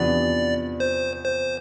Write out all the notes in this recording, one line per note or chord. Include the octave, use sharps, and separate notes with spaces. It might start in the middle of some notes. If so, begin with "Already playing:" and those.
Already playing: E2 C3 F3 B3 D4 D5
C5
C5